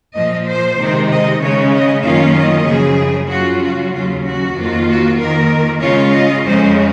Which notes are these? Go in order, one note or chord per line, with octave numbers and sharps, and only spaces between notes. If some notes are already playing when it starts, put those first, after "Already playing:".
A#2 F3 A#3 D#5
C5
C3 D#3 G#3 D#4
D#5
C#3 G#3 C#4 C#5
D#5
F#2 D#3 A#3 C#4 F4 F5
D#5
F#2 C#3 F3 G#4
C#3 F#3 C#4 F4 F#4
F#4
D#2 C#3 F#3 C#4 F4
F#4
F2 D#3 A#3 F4
F#4
F2 D#3 A#3 A#4
C#3 G#3 C#4 F4 C#5
D#5
F2 C#3 G#3 C#4 C5